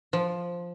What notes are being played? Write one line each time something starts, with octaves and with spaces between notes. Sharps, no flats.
F3